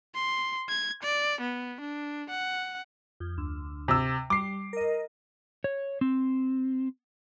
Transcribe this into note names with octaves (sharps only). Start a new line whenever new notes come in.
C6
G#6
D5
B3
D4
F#5
F2
D2
C3 E6
G3 D6 C7
A#4 D#5
C#5
C4